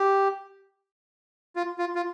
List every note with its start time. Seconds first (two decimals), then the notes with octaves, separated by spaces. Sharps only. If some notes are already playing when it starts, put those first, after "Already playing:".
Already playing: G4
1.56 F4
1.78 F4
1.95 F4